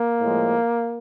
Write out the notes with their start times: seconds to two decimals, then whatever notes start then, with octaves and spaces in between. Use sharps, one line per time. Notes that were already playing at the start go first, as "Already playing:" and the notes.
Already playing: A#3
0.21 A2 F3 G#3